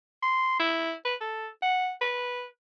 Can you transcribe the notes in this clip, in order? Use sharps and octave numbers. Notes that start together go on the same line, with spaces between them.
C6
E4
B4
A4
F#5
B4